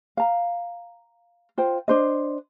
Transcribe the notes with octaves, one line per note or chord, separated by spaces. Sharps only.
F5 A#5
F4 C5 G5
D4 C5 D#5